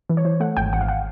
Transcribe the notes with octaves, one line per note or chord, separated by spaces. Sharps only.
E3
C#5
E3 C5
A3 F#5
G#1 G5
G#1 F#5
F5
F#5